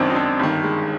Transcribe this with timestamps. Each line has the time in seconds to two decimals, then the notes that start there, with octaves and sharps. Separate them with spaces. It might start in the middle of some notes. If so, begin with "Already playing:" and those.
Already playing: G#1 F#2 D#3 C4 D4
0.10 D#4
0.15 C4 D4
0.39 G1 G2 D#3
0.63 G#3